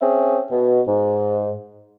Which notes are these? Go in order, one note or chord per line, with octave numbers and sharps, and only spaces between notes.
C4 C#4 G#4 E5
B2
G#2